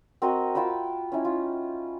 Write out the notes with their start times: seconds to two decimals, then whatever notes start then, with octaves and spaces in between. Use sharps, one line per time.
0.22 C4 F#4 A#4 D#5
0.55 F4 G5 B5 E6
1.12 C#4 D#4 E4
1.25 F4